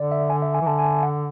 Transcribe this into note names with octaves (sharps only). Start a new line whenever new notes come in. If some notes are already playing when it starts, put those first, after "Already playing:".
Already playing: D3 D5
E5
G#5
E5
G#5
E3
D3 A5
G#5
F#5